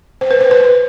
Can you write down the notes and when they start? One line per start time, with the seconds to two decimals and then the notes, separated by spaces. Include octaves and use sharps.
0.21 C5
0.31 B4
0.41 C5
0.51 B4